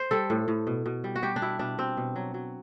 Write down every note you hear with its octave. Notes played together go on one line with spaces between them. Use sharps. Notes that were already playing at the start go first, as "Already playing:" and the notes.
Already playing: C5
G3 A4
A2
A2
B2
B2
G3
F#4
G3 G4
D4
B2 E4
B2 D4
B2 C4
B2
F#3
F#3